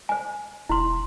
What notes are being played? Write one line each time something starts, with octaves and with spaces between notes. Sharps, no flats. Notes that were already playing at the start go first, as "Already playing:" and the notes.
C5 G#5
E1 E4 C6